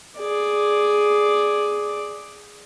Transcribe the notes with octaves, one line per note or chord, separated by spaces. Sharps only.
G#4 D5